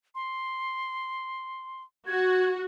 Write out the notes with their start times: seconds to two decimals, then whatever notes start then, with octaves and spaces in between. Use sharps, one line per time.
0.15 C6
2.07 F#4 G#6